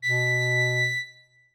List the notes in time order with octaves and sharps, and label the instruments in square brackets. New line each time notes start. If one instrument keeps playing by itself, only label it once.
[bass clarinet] B2 [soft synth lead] B6